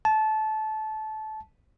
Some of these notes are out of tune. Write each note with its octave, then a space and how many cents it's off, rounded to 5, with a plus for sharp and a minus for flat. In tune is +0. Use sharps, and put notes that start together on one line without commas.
A5 -20